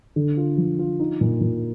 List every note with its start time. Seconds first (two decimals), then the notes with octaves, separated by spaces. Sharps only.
0.16 D3
0.37 F4
0.58 F3
0.79 F4
1.00 D#4
1.21 A#2
1.41 A#2